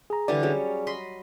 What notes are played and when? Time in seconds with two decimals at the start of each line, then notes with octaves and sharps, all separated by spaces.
0.10 G#4 A#5
0.28 D3 E3 G3 D5
0.43 F#3 G3 C#4 G#4 D5
0.87 D#5 B5 C6